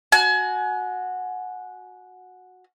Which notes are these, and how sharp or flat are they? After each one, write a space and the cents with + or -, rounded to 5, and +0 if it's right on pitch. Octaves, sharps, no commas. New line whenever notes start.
F#4 -10 G#5 +30